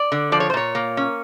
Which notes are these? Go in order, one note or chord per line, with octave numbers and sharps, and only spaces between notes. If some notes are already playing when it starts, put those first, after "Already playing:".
Already playing: D5
D3
F3 D5
C#5
C5
A#2 C#5
A#3
C#4